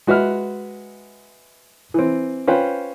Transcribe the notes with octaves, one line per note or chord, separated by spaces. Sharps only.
G#3 F#4 B4 E5 F6
E3 C4
C#4 F4 B4 C5 G5